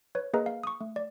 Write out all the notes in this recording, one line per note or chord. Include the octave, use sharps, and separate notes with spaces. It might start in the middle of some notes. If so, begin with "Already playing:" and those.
B4 C#5
A#3 G#4 A#4 B4 D#5 A#5
F5
C#6 D#6
A3
D5